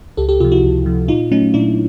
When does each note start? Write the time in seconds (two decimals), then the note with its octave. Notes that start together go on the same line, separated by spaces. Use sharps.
0.17 C#2 G4 A4
0.29 G4 A4
0.40 C3 F3 F4 G4
0.52 E4 F#4
0.63 C#2
0.86 C3 F3
1.08 A#2 D#4 F4
1.31 F#3 A3 C#4 D#4
1.54 A#2 D4 E4